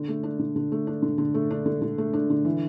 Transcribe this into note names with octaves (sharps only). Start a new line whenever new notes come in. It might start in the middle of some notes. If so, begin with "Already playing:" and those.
Already playing: D3
A3
D4
D3
D3
A3
D4
D3
D3
A3
D4
D3
D3
A3
D4
D3
E3